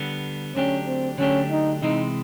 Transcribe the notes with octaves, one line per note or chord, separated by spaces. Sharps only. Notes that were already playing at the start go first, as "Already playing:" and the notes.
Already playing: D3 G3 B3
D3 F#3 A3 C#4 D4 G4
C4
D3 F#3 A3 C#4 D4 G4
D#4
C3 E3 G#3 C4 D#4